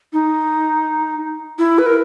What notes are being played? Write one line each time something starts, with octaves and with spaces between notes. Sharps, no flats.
D#4
E4
B4
A#4